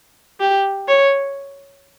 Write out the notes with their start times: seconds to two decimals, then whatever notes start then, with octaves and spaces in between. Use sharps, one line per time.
0.40 G4
0.88 C#5